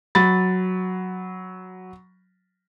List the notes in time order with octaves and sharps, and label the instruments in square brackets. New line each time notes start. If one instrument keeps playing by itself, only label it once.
[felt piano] F#3 B5 A6